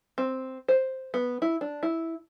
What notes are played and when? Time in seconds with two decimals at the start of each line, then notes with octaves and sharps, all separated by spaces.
0.18 C4
0.68 C5
1.14 B3
1.42 E4
1.61 D4
1.83 E4